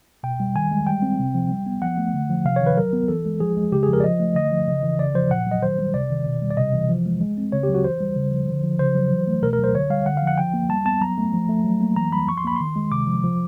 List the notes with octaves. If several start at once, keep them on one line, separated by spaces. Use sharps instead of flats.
B2 G5
G3
D#3 G#5
G#3
G3 G5
C4
C3
F3
G3
B3
F3 F#5
A3
D3
F3
C3 F5
C#5
D#3
B4
F#3 A#4
B3
E3 A4
G#3
F3 G#4
G#3
C#3 G4
G#4
F3 A#4
D5
F3 D#5
A3
D3 D#5
F3
C#3
E3
C#3 D5
F3 C5
A#2 F#5
F#3 D#5
D#3 C5
G3
C3 D5
D#3
B2
G3
D5
C3 D#5
E3
F3
G#3
G#3
C4
C#3 C#5
G4
F#3
F#4
E3 C5
G3
C#3
F3
D3
F3
C#3 C5
F#3
E3
A3
B2 A#4
A#4
F#3
C5
D3 C#5
G3 F5
D3 F#5
F5
F3
F#5
F3 G5
A#3
G3 A5
B3 A5
F#3 A#5
A3
F3
A3
F#3
A#3
E3 A#5
G3 B5
F3 C#6
C6
A#3 B5
D#3 C6
G#3
C3 D6
F3
F3